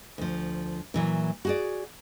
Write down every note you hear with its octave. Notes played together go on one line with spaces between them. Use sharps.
D2 F3
A#2 E3 F#3
F#4 G#4 D5